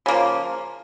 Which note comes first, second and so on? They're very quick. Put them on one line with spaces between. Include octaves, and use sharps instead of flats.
C#3 A#3 F3